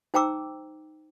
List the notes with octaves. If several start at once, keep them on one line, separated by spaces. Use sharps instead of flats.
D#4 C5 G5 A#5 D6 E6